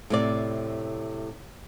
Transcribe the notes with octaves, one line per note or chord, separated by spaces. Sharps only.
A2 C3 D5